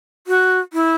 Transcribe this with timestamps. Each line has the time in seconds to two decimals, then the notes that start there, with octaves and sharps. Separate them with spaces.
0.27 F#4
0.73 E4